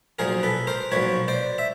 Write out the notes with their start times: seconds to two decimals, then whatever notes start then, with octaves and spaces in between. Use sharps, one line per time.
0.19 B1 A#2 F3 G#4 A#4
0.43 A4 B4
0.67 A#4 C5
0.91 B1 A#2 F3 B4 C#5
1.28 C5 D5
1.58 E5